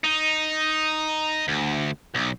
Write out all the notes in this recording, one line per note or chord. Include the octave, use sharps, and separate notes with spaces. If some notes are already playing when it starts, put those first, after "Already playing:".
D#4
D2
B1